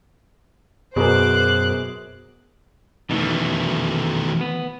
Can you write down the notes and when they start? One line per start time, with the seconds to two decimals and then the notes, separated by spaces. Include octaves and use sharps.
0.96 F#2 B2 G#4 A#4 C5 D6 F#6
3.10 F2 B2 D#3 E3 A3
4.41 B3